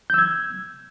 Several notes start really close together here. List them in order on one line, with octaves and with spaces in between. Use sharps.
G6 E6 G#6